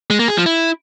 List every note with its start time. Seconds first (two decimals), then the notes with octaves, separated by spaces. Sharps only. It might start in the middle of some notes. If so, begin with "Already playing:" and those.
0.10 G#3
0.19 A#3
0.28 G#4
0.37 F3
0.46 E4